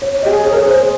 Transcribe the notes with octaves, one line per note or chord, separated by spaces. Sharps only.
C#5
G4 D#5
G#4
C#5
A#4
G#4
C5